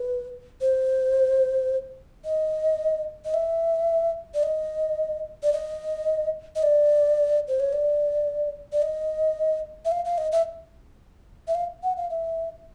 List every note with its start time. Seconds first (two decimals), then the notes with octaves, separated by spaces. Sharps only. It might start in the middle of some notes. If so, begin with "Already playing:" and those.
Already playing: B4
0.61 C5
2.25 D#5
3.25 D#5
3.34 E5
4.34 D5
4.43 D#5
5.43 D5
5.53 D#5
6.56 D#5
6.63 D5
7.48 C5
7.60 C#5
7.73 D5
8.73 D5
8.82 D#5
9.85 E5
9.92 F5
10.05 F5
10.18 D#5
10.32 E5
11.48 E5
11.55 F5
11.83 F#5
11.97 F5
12.10 E5